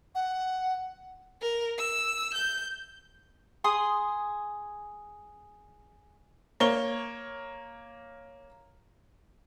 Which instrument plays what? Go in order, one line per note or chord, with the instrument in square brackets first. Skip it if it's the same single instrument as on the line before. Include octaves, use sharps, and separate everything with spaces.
[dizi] F#5
[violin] A#4
E6
G6
[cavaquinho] G#4 C6 D#6
[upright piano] A#3 C#5 G7